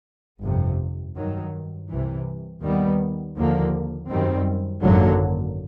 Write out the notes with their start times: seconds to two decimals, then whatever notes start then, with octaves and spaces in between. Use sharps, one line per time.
0.42 G1 F2 C3
1.15 G2 D#3 F#3
1.88 C2 C3 E3
2.62 D#2 D#3 G3 B3
3.35 D#2 D3 F3 A#3
4.08 F#2 D#3 G3 C4
4.82 G#1 F#2 D3 F#3 A#3